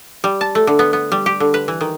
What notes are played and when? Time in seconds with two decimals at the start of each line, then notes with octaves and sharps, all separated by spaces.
0.24 G3
0.41 A5
0.55 A3
0.67 D3
0.79 B3
0.93 B3
1.12 G3
1.26 G4
1.40 D3
1.54 B4
1.68 E3
1.81 D#3